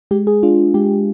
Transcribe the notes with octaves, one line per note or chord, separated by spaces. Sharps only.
G#3 G4
G#4
D4 F4
G#3 G4